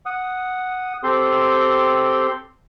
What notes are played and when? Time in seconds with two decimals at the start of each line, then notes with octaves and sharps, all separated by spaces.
0.06 F#5 D#6
1.03 C4 G4 A4 C6